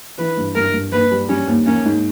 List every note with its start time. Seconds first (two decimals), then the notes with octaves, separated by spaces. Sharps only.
0.18 E3 B4
0.37 G2
0.55 G2 A#4
0.74 G2
0.92 D#2 B4
1.12 G3
1.29 G3 C#4
1.47 D#2
1.66 A#3 C#4
1.86 G#2